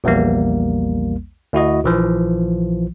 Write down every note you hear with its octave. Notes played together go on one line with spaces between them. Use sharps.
A#1 E2 G3 A#3
D2 E4 F#4 D#5
A#1 E3 F3